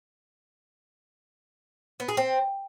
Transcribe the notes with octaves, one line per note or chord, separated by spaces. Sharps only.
B3
G#4
C4